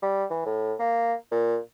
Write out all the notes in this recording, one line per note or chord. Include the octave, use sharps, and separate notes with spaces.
G3
E3
A2
A#3
A#2